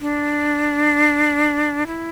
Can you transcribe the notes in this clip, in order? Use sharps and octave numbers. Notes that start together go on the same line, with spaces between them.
D4
E4